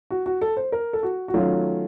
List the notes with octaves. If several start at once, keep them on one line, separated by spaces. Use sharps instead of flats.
F#4
F#4
A4
C5
A#4
A4
F#4
F#4
D#3 F#3 A3 C#4 F4